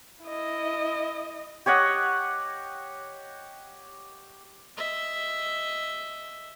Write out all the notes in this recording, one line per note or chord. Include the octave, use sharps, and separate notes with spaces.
E4 D#5
G4 C#5 D#5 F#5
D#5 E5